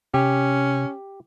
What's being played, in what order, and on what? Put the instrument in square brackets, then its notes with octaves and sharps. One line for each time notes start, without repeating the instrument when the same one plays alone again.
[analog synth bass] C3 [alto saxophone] C#4 [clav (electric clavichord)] G4